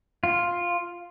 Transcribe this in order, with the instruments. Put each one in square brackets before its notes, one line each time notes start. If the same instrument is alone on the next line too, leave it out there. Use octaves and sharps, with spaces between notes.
[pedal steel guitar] F4